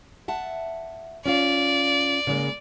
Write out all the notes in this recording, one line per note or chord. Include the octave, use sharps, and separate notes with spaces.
E5 F#5 A5
C#4 F4 D5 F5
C#3 G#3 A#3